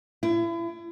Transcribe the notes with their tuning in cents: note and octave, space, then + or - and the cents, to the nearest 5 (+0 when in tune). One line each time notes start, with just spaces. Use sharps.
E4 +35